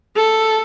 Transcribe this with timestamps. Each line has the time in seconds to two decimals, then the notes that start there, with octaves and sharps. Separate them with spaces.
0.16 A4